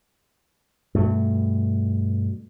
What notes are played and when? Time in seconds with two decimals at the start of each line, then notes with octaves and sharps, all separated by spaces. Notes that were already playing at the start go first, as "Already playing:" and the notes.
0.94 G2 B2 A3